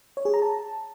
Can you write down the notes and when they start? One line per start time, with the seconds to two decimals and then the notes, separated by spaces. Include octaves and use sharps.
0.17 C#5
0.25 G#4
0.34 A#5
0.42 A5